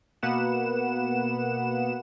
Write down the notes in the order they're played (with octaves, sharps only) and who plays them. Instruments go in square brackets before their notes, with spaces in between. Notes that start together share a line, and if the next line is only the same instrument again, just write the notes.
[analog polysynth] B2 A#3 B3 B4 F#5 E7